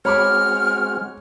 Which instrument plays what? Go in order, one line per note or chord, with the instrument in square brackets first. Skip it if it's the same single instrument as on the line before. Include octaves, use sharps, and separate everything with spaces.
[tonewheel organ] G#3 C4 F#4 [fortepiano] C#5 B5 D6 [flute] F6